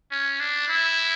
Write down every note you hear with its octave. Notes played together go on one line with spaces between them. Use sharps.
C#4
D4
E4